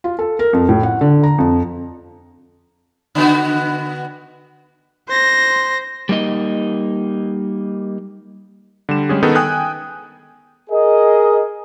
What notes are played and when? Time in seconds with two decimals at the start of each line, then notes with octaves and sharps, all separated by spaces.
0.04 F4
0.19 A4
0.39 A#4
0.53 F2
0.69 A2
0.83 F#5
1.01 D3
1.23 A#5
1.38 F2
3.15 D3 B3 F#4
5.08 C5 A#6
6.09 G3 A#3 D#4 D#5
8.89 D3 G3 E7
9.09 G3 G#3 C#4 G#4
9.23 D#3 B3 D#4 G#4 A4
9.35 G5 G#5 D#6 F#6
10.70 G#4 A#4 D#5